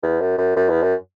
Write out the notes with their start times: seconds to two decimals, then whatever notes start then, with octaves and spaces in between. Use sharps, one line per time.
0.03 E2
0.21 F#2
0.38 F#2
0.57 F#2
0.69 E2
0.82 F#2